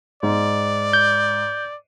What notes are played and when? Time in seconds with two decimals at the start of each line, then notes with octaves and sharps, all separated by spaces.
0.23 G#2 D5
0.93 G6